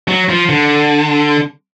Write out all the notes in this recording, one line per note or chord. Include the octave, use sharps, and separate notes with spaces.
F#3
F3
D3